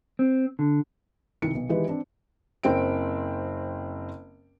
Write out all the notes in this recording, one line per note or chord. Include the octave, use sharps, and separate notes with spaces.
C4
D3
C2 D#3 E4 C#7
B1
D#3 E3 G#3 G4 B4 D#5
C4 D4
F#1 C4 G5 D7